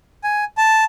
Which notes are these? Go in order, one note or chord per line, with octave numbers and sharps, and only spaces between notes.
G#5
A5